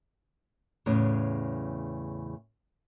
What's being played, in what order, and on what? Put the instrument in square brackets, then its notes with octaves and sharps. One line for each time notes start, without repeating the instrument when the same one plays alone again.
[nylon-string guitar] E2 A2 C#3